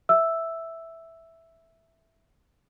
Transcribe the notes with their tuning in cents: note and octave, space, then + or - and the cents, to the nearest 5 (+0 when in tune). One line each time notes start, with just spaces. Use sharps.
E5 +0 E6 +0